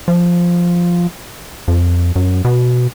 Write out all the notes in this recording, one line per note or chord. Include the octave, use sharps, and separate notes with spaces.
F3
F2
F#2
B2